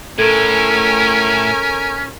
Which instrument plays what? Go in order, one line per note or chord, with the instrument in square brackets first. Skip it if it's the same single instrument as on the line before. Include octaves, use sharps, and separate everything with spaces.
[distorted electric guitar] A2 [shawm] C#4 [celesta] A4 G#6 [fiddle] A#4 G#5